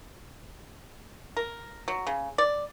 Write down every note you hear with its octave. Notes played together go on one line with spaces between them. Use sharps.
A#4
F#3
C#3
D5